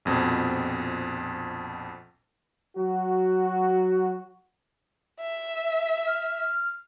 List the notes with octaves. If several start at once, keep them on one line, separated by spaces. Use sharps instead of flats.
A#1 F2 B2 C4
F#3 F#4
E5
F6